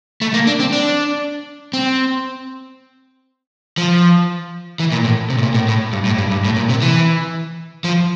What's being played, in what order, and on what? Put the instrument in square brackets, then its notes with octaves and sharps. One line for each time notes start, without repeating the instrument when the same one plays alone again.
[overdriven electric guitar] A3
A#3
D4
C4
D4
C4
F3
E3
A#2
A2
C3
A2
A#2
A2
A2
G2
A2
G2
G2
A2
A#2
C3
E3
F3